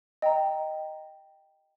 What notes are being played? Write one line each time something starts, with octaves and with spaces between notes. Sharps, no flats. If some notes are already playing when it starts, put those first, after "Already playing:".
D#5 G5 A#5